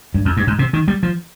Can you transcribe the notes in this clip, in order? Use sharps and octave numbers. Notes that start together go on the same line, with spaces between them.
G2
F2
G2
G#2
C3
D#3
G3
F3